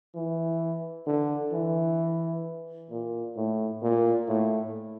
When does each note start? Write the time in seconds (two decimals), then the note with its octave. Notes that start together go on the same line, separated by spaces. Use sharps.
0.15 E3
1.07 D3
1.52 E3
2.91 A#2
3.36 A2
3.82 A#2
4.28 A2